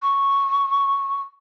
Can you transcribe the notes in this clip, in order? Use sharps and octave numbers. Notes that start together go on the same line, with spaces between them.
C#6